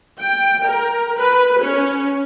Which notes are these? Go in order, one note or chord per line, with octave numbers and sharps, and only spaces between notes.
G5
A#4
B4
C#4